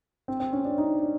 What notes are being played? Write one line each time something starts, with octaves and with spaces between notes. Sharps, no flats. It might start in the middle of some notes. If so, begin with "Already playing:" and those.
C4
C4
C#4
D4
D#4
D4